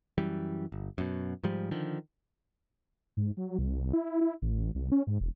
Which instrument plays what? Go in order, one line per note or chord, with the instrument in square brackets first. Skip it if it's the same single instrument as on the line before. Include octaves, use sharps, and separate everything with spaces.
[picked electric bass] F#2 E3 G3
G1
F#2 B2
G#2 F3 G3
D3 D#3 F3
[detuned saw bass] G#2
F#3
C2
E4
E4
A1
C2
C#4
G#2
E1